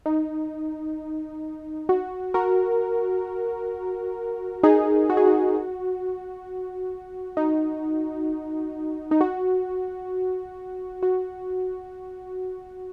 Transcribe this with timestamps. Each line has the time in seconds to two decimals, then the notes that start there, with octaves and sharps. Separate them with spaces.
0.06 D#4
1.89 F#4
2.34 F#4 A#4
4.63 D#4 G#4
5.10 F#4
5.17 G#4
5.27 F#4
7.37 D#4
9.11 D#4
9.21 F#4
11.03 F#4